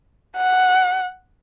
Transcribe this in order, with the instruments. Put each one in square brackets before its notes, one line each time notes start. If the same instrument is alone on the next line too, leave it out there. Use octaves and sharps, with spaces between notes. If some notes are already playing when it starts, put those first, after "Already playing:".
[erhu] F#5